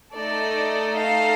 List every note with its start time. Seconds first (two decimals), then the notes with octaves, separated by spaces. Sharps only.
0.15 A3 D#4 A4 D5
0.97 F5